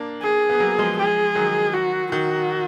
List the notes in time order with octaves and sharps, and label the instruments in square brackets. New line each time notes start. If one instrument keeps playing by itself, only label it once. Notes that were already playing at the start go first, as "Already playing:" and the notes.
Already playing: [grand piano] A#3 D4
[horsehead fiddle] G#4
[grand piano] B3
F#3 A#3
F3 G#3
[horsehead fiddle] G#4
[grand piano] D#3 F#3
[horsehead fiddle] F#4
[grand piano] D#3 [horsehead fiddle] F#4